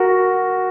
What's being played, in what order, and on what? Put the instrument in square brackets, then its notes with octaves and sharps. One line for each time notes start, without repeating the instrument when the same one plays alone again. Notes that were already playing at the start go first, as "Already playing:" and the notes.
Already playing: [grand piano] F#4 A#4